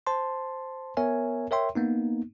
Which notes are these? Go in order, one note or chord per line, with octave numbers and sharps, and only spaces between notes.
C5 A5 C6
B3 A#4 C#5 E5 G#5
A#4 C#5 E5 G5 C6
A#3 B3 D#4